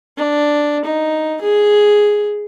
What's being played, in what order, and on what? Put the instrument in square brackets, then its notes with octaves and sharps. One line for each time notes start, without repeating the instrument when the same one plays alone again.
[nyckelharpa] D4
D#4
G#4